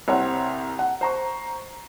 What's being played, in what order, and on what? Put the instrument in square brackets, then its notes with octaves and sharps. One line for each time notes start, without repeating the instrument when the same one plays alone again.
[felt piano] C2 C4 C#5 F#5 C6
F#5
C5 A#5 C#6